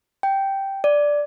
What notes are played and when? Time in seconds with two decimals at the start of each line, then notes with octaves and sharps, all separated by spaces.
0.23 G5
0.84 D5